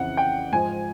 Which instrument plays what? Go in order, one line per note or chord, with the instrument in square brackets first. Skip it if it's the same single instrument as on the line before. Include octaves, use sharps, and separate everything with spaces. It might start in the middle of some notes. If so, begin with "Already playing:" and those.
Already playing: [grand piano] F2 C#3 E3 F#5
G5
G#2 F3 G#5